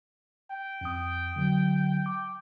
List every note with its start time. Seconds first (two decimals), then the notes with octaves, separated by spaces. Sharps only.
0.51 G5
0.81 F2 D#6
1.36 D3 F#3
2.06 D6